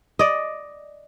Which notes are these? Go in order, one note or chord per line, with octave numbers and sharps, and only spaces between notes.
D5 D#5